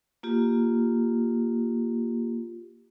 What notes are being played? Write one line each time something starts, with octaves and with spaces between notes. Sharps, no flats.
A#3 F4 G4